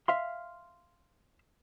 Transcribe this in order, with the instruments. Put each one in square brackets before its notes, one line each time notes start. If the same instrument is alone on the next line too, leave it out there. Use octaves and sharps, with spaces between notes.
[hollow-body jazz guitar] E5 F5 C6